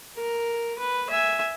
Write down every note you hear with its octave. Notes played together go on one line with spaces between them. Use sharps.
A#4
B4
E5 G#5